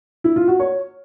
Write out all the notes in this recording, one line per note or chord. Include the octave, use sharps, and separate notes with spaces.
E4
F4
F#4
C#5